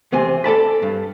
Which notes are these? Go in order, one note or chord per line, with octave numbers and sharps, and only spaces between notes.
E2 C3 C4 G#5
A4 D5 A5 B5
G2